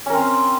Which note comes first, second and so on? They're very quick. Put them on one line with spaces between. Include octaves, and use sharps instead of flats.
C#4 A#4 C4 C5